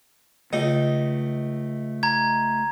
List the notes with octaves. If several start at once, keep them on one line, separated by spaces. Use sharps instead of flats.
C#2 A3 D#4
A#5 G#6